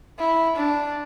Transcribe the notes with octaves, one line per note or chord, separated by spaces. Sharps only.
E4
D4